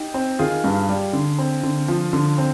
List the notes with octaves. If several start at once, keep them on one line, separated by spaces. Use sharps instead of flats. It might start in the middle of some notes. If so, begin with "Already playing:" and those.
Already playing: D#4 G4
C4
D#3 F4 G#4
G2
G3
D3
C4
D3
F3
D3
C4